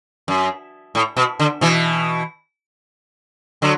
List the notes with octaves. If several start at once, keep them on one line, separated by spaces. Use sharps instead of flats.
F#2
A2
B2
D3
B2 E3
D3 F#3